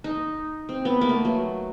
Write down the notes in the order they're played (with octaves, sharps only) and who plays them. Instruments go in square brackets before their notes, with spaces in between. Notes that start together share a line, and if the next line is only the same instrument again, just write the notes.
[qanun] D#4
C4
B3
A#3
A3
F#3